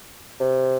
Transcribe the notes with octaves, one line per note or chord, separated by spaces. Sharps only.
C3